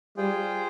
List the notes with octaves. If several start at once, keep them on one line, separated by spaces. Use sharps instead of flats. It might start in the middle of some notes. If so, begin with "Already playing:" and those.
G3 F4 G#4 C5 G5